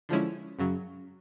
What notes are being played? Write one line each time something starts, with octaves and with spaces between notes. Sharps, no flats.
D3 F3 G#3 C#4 E4
F#2 C#3 F#3